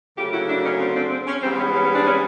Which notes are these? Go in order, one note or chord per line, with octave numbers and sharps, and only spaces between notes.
D2 C#3 F#3 A#3 F4 G4
E4 F#4
D4 E4
C#4 D#4
C4 D4
C4 D4
C4
C#4
G#2 E3 G3 B3 C4
C#4
C#4
C#4
C4 D4
C#4